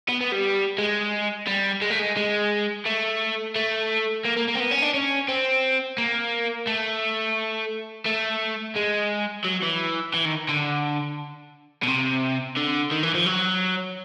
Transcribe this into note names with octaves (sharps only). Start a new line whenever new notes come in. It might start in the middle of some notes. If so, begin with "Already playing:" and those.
B3
B3
G3
G#3
G3
G#3
A3
G#3
G#3
A3
A3
A#3
A#3
A#3
C4
B3
C#4
D4
C#4
C4
A#3
A3
A3
G#3
F#3
E3
E3
D#3
D3
B2
C3
D3
D#3
E3
F3
F#3